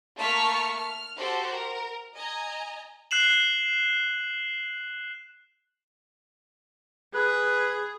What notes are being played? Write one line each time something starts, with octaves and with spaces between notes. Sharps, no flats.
A3 A#3 A5 C#6 F6 B6
F6
F#4 G4 A4 C5
A#4
D#5 G#5 A#5
F#6 C7 E7 F#7
G#4 B4